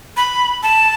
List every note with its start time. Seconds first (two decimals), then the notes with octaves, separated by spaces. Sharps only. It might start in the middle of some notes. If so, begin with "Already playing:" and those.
0.17 B5
0.63 A5